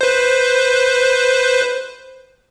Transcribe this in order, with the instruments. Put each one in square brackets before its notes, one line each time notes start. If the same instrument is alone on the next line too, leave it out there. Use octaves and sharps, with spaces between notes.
[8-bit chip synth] B4 C5